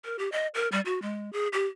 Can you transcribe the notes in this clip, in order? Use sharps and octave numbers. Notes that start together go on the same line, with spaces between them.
A#4
G4
D#5
A#4
G3
F#4
G#3
G#4
G4